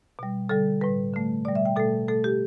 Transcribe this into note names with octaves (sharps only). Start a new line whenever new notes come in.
B2 G3
D3 G3 A4
A2 G3 B4
D3 A3
B2 G3 D5
E5
G5
B2 A3 A4
B2 A3 A4
G4